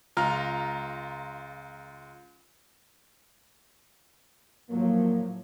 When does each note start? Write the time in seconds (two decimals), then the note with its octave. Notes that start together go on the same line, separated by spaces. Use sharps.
0.17 C#2 F4 A#5 F6
4.70 A2 F3 F#3 A#3